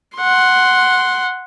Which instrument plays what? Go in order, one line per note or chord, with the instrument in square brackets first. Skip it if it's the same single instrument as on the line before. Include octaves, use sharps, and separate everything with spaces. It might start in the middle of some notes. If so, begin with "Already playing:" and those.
[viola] F#5 C6